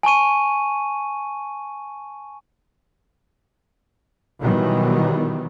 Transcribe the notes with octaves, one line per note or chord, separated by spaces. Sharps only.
G#5 A5 C#6 D#7
B2 D#3 E3 F#3 G3 B3